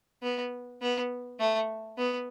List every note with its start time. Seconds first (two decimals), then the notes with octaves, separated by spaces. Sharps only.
0.23 B3
0.82 B3
1.39 A3
1.98 B3